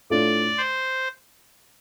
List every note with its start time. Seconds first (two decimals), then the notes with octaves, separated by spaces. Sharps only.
0.10 A2 A3 D4 F4 D5
0.58 C5